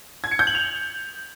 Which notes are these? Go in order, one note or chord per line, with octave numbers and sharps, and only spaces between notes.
G#6
C#7
G6
F#7
F7